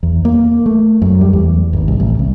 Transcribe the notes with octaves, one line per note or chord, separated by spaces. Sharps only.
E2
A#3
A3
F#2
G3
E2
G#1
C2
A1
C2